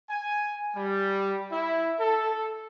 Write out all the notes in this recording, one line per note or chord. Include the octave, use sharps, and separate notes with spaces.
G#5
G3
E4
A4